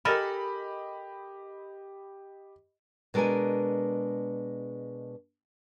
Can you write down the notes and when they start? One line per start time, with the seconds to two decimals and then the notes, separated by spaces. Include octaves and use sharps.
0.05 G4 A4 A#4 D#5 G#5 B5
3.14 B2 G#3 D4 A#4 B4 G#5